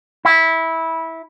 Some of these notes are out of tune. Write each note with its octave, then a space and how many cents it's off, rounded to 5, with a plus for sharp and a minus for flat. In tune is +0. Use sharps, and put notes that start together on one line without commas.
E4 -15